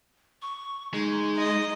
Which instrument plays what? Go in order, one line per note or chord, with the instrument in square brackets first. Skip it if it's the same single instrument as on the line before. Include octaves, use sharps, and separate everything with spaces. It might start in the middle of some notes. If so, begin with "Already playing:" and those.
[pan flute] C#6
[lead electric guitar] G#3 [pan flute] D#4
[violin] D#5